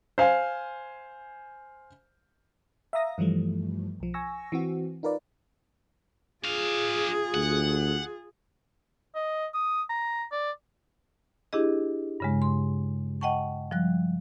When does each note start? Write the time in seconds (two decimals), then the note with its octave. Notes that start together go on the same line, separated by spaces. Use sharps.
0.18 C5 F5 G#5
2.93 E5 F5 A#5 D#6 A#6
3.18 G2 E3 F3 G3 A3
4.00 B1 F3
4.14 G#5 C#6 E6 A#6
4.52 E3 C4 F#4
5.03 D#4 F4 A#4 B4 D5
6.45 D4 F4 G#4 F5
7.34 D2 F#5
9.15 D#5
9.54 D#6
9.89 A#5
10.32 D5
11.53 D4 E4 G4 G#4 D#5
12.20 G2 C#3 G#3
12.42 C6
13.21 D#5 F#5 G5 A5 C#6
13.71 F3 G3 F#6